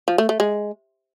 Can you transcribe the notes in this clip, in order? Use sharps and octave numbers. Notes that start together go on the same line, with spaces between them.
F3
A3
A3
G#3